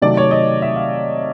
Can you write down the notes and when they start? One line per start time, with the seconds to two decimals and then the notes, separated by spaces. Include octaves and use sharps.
0.02 C3 D#3 F#3 A3 D5
0.17 C#5
0.31 D#5
0.62 E5
0.76 F5